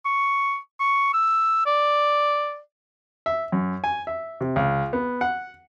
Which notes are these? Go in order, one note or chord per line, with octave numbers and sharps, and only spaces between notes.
C#6
C#6
E6
D5
E5
F#2
G#5
E5
C3
C#2
B3
F#5